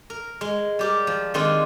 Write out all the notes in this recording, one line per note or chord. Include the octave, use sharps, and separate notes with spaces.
A#4
G#3
G3 G4 A#4
F3
D#3 G#3 C4 D4 F4